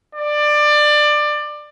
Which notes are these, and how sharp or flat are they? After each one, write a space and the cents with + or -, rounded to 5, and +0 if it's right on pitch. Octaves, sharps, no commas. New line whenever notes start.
D5 +20